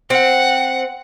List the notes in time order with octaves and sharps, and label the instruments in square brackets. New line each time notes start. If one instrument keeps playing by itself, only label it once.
[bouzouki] C4 [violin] F#5